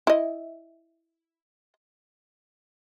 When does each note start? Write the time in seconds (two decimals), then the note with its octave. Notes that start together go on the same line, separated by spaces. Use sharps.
0.07 E4 D#5